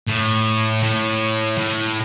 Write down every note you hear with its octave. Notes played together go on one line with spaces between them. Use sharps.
A2
A2
A2